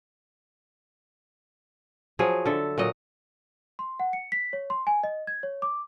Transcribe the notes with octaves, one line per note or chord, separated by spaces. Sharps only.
F3 F#3 G#4
D3 A4 E5
A#2 F#3 D#5
C6
F#5
C#7
B6
C#5
C6
G#5
D#5
G#6
C#5
D6